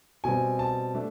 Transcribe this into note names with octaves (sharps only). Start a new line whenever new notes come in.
B2 G3 C4 G#5
A5
A3 D4